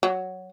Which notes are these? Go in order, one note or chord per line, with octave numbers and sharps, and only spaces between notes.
F#3